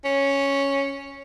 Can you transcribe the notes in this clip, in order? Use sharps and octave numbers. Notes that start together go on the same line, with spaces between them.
C#4